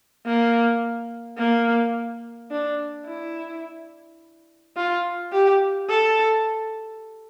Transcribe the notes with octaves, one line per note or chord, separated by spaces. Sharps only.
A#3
A#3
D4
E4
F4
G4
A4